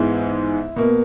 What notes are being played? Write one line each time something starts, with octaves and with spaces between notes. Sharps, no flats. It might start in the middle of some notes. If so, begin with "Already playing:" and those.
Already playing: G#2 E3 G#3 B3 E4
B2 A#3